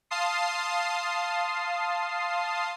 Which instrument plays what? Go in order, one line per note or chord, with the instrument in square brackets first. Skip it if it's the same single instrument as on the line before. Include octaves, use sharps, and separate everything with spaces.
[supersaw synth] F5 A5 C6 D#6 C7